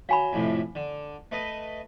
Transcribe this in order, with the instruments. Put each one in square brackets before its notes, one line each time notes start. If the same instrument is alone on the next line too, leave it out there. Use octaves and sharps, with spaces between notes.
[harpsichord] F#3 [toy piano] F5 G#5 B5
[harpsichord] F2 A2 C3
D3
A3 B4 D#5